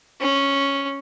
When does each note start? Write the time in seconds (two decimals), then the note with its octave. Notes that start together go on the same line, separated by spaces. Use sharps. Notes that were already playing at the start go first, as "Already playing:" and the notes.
0.20 C#4